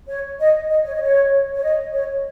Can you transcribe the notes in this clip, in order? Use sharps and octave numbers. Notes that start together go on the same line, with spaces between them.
C#5
D#5
D#5
C#5
D#5
C#5
C#5
D#5
C#5